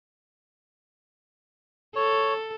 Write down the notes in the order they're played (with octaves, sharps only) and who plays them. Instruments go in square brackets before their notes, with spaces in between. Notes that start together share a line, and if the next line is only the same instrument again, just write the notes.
[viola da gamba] A4 [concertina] C#5